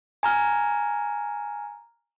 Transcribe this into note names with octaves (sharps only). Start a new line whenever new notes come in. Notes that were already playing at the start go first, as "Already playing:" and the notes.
G#5 A#5 F6